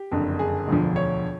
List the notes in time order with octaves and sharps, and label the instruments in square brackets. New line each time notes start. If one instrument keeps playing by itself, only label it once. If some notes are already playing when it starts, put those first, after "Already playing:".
Already playing: [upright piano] G4
F#1 F2 D3
G#4
E1 D2 D3 F3
C#5